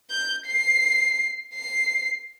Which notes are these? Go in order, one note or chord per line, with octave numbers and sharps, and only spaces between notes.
G6
C7
C7